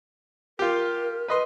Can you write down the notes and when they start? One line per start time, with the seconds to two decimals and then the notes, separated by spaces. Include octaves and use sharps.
0.59 F4 G4 A#4
1.28 B4 D#5 C6